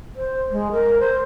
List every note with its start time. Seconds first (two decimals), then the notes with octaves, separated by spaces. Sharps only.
0.16 C5
0.51 G#3
0.72 A#4
1.00 C5